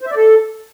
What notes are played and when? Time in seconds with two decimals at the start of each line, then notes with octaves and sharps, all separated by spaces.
0.01 C5
0.06 E5
0.11 D5
0.16 A4